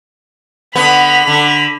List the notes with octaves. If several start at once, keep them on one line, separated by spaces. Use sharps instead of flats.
D3 B3 B5 F7
D3